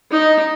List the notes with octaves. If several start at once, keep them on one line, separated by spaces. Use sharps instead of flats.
D#4